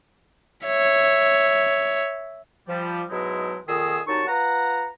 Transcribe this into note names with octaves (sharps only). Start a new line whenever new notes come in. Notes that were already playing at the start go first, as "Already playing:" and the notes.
C#5 E5
F3 G3
G#2 B2 F#3 G#3 D#4 E4
F2 A#2 D#3 G#4 D#5 E6
C2 F#3 D#4 A5 C#6
F4 B4 F#5 A#5